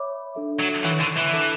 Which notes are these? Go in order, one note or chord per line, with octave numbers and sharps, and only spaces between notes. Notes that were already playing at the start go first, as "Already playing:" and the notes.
Already playing: C#5 E5 B5 D6
D4 A4 E5
F#3
E3 C#5 F#5 C#6
D3
E3
D4 A4 E5 A5 D6